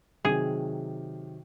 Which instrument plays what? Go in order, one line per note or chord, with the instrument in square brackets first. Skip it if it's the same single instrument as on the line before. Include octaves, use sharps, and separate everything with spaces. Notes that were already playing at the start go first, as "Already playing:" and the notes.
[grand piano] C3 D#3 F#3 [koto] G#4